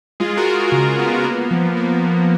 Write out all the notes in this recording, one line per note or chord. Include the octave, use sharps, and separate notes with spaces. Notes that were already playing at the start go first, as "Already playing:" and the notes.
G#3 F4 G#4
F#4 A#4
G#3
F#4
C#3
B3
A#3
F3
A#3
F3